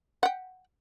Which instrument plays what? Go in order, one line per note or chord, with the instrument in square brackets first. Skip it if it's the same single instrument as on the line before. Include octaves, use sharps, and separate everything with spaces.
[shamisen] F#5 G5